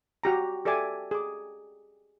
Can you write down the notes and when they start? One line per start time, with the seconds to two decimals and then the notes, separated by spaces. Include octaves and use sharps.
0.23 F#4 G4 A#5
0.65 G4 A4 D5 E5 G#5 D6
1.11 G#4 D6